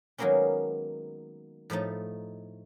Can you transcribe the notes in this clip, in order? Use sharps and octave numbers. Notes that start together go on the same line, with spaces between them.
D#3 F#3 G#3 A#3 B3 C#4
A2 F3 A3 D#4